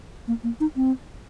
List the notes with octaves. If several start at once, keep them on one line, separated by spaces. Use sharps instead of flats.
A#3
A#3
D#4
C4